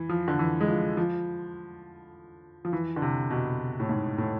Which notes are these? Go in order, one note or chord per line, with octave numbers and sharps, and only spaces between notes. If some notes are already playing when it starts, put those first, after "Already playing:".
Already playing: E3
F3
D3
E3
G#3
F3
F3
F3
E3
D3
C3
B2
A2
G#2
A2